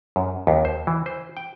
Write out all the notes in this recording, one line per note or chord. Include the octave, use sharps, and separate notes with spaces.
F#2
D#2
C5
E3
C5
G5